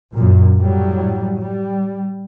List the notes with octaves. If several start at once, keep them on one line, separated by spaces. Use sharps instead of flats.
F#2 A#2
A2 F#3 G3
G3